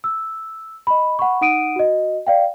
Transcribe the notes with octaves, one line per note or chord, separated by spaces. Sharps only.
E6
D#5 B5
F#5 B5 C#6
D#4 F#5 D#6 D7 D#7
F#4 D#5
D5 F5 G5